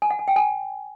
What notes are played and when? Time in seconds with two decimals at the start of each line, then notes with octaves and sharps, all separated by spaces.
0.02 G#5
0.11 F#5
0.19 G#5
0.28 G5
0.36 G#5